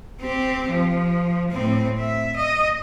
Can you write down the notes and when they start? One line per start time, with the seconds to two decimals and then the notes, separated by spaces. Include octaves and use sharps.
0.20 C4 G4
0.69 F3
1.51 A2 C4
1.99 E5
2.36 D#5